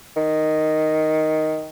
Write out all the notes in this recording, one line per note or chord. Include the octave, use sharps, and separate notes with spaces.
D#3